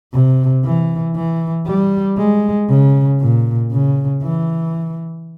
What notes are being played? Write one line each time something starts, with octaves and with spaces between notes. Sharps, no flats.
C3
E3
E3
G3
G#3
C#3
A#2
C#3
E3